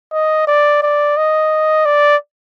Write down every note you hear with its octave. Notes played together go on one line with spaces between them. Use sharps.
D#5
D5
D5
D#5
D5